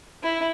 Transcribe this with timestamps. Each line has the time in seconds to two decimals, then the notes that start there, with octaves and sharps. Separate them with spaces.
0.23 E4